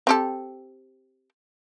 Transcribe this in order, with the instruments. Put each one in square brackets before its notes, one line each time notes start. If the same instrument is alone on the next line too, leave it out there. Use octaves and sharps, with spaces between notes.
[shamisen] C4 G4 A4